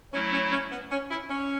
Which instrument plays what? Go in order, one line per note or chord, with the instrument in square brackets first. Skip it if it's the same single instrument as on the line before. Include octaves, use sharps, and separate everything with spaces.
[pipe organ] F#3 A3 E4 [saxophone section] C#4
[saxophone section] C#4
C#4
B3
C#4
E4
C#4